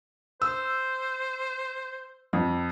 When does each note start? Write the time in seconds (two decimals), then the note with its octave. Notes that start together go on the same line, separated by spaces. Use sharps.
0.42 C5 E6
2.33 F2